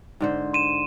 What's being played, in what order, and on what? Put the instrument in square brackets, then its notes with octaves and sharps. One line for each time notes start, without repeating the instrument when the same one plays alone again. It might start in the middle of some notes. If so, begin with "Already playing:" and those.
[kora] G#2 D3 C5
[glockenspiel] C6 D#7 E7